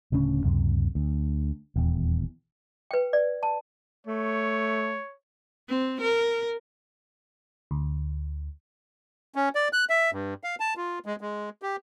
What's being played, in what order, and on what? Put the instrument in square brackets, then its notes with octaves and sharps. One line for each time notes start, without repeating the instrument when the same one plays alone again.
[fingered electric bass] D1 D2 C#3 C#4
C#2 F#2 C3
D2
D#1 E2
[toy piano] B4 G5
D5
A5
[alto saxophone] A3 [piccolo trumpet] C#5
[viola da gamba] C4
A#4
[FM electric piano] D2
[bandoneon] C#4
D5
F#6
E5
G2
F5
A5
F4
G#3
G#3
G4